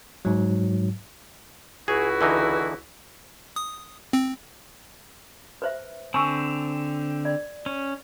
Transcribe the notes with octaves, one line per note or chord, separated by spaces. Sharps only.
G#2 F#3
C#2 E4 F#4 G#4
D3 E3 D#4
D#6
C4
B4 C5 E5
D3 C4 G#5 C#6 E6
D5
C#4